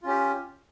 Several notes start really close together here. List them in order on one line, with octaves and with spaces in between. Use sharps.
F4 C#4 G4